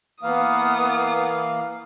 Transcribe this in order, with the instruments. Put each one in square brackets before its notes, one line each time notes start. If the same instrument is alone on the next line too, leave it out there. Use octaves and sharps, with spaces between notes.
[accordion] E3 A#3 F5 [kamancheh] B3 D#6